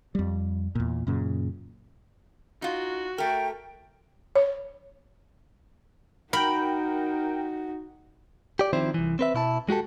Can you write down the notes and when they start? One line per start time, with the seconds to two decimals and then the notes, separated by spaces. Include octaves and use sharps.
0.15 F2 G3
0.75 E2 A#2
1.07 F#2 A#2 C#3
2.62 D#4 F4 F#4
3.18 A3 A#4 G5
4.36 C#5
6.33 D#4 F#4 A#4 G5 B5
8.59 G4 D5
8.73 D#3 F3 C4 E4 C5
8.94 C2 E3
9.19 C4 B4 E5
9.34 B2 E4 A5
9.69 G#3 F#4 G4 A4